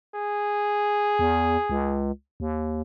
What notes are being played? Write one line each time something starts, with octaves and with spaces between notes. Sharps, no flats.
G#4
E2
C#2
D#2